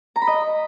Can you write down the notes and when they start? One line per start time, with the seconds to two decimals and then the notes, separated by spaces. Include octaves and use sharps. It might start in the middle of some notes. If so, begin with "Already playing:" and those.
0.16 A#5
0.22 B5
0.27 D#5